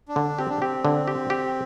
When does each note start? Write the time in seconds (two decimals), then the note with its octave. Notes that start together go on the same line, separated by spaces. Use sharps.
0.09 D4
0.16 D3
0.39 C4 G4
0.50 D4
0.60 C4 G4
0.85 D3
1.07 G4
1.30 G4